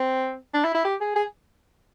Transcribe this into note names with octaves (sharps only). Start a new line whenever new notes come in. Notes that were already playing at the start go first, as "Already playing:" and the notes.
Already playing: C4
D4
E4
E4
G4
G#4
G#4